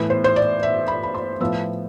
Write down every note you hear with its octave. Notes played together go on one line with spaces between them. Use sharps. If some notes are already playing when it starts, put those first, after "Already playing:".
Already playing: A2 E3 B3 B4
C5
C5
D5
E5
B5
B5
C6
A2 F3 B3 E6